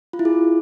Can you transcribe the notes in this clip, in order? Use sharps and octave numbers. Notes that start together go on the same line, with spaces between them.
F4
E4
G#4